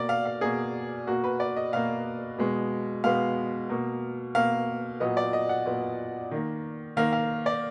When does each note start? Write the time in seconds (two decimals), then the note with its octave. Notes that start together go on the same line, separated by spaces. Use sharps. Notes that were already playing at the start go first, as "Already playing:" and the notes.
Already playing: B2 A#3 D5
0.09 F5
0.25 F5
0.41 B2 A#3 G#4
1.07 B2 A#3 F#4
1.24 B4
1.40 D5
1.56 D#5
1.73 B2 A#3 F5
2.38 B2 G#3 B3
3.04 B2 G#3 B3 F5
3.70 B2 A#3
4.35 B2 A#3 F5
5.00 A#2 F#3 B3 D#5
5.17 D5
5.33 D#5
5.49 F#5
5.66 A#2 F#3 B3
6.31 D#3 A#3
6.97 D#3 A#3 F5
7.13 F5
7.46 D5